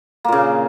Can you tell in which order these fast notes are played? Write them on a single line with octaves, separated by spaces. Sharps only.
A#3 A#2 C#3